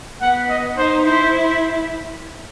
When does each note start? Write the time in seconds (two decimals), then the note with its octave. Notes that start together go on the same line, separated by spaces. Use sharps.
0.22 B3 F#5
0.50 D#5
0.77 D#4 C5
1.05 E4 C5